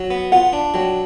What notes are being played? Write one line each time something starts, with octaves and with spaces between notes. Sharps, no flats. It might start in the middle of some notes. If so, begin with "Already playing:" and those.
Already playing: F#3
B3
F4 F#5
D4
F#3 G5